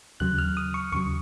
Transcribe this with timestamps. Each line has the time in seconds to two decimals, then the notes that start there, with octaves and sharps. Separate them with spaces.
0.20 D#2 C#3 F#3 F#6
0.38 F6
0.57 D#6
0.74 C#6
0.92 D#2 C#3 F#3 C#6